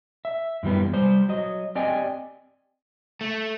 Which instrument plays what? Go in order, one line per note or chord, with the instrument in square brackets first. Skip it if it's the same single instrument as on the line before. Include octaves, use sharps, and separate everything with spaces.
[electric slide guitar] E5
F#2 E3 G3 B3
G3 C5
F#3 D#5
C4 G4 D5 D#5 G5 G#5
[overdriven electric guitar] A3